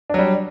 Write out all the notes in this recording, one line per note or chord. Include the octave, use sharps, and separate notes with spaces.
F#3 G3 D4